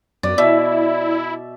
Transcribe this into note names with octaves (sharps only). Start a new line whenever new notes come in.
F#2 B3 D5
B2 E4 D5 E5